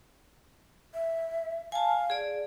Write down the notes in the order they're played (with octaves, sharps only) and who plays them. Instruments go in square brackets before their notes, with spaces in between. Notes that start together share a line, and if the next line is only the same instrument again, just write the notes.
[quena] E5
[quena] F5 [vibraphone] G#5 A5
[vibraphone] G#4 D5